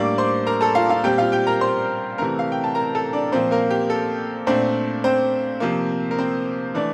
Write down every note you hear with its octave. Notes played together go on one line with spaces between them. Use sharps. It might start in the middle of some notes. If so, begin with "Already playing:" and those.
Already playing: A2 G3 A#3 D4 D5 D6
C5 C6
A#4 A#5
A4 A5
F4 F5
F4 F5
A#2 G3 C4 G4 G5
F4 F5
G4 G5
A#4 A#5
C5 C6
C3 E3 A3 C4 A#4 A#5
F5
G5
A5
A#4 A#5
A4 A5
D4 D5
A#2 F3 A#3 C4 C5
A#3 A#4
G4
A4
A#2 A3 C4 D4 C5
C4 C5
C3 F3 A#3
A#4
C4 C5
E3 A3 D4 D5